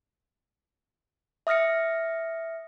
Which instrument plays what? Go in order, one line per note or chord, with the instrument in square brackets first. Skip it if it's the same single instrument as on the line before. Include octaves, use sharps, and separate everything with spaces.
[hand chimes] E5 D#6 F6 A#6 C#7